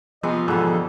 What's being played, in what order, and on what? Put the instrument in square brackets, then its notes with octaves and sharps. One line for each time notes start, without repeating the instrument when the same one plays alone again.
[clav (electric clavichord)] C3 C4 [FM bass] F3 [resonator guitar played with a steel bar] B3 G#4 B4 [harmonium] D#5
[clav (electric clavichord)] G#2 B2 E3 [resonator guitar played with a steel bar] D3 G3 [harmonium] G#4 A4